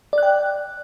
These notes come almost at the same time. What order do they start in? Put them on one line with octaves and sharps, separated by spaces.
D5 F#6 G5